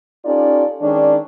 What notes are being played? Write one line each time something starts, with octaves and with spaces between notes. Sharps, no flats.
C#4 D#4 F4 G4 A4 D5
D#3 G#3 C#4 D4